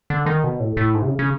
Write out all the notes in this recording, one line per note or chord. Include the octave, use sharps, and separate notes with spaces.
D3
D#3
B2
A2
A2
G#2
C3
C#3
C#3